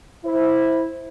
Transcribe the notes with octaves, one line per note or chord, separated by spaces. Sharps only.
E4 C5